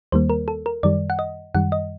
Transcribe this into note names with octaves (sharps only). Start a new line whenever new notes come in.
D#2 D#3 G3 A#3 C5
A#4
A4
A#4
F#2 D#3 G3 D5
F#5
D#5
F#2 D#3 G3 F#5
D#5